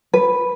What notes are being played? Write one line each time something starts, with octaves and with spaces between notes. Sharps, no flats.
B4